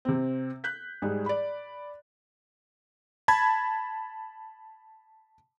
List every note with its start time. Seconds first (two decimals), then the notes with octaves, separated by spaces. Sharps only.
0.05 C3 C4
0.64 F#6 G6 B6
1.02 G#2 G3 G#4
1.26 D5 B5
3.28 A5 B5 G#6